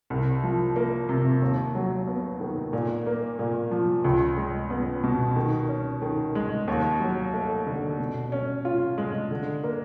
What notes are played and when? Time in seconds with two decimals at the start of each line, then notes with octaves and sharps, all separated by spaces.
0.10 C2
0.44 F3
0.76 A#3
1.09 C3
1.42 D#2
1.75 F#3
2.07 B3
2.40 D#3
2.73 A#2
3.06 A#3
3.39 A#2
3.71 F3
4.04 C#2
4.37 G#3
4.70 B3
5.04 B2
5.36 D#3
5.68 C#4
6.02 D#3
6.35 G#3
6.68 D#2
7.00 F#3
7.33 A3
7.67 D3
7.99 B2
8.32 C#4
8.65 F4
8.98 G#3
9.31 D3
9.63 A#3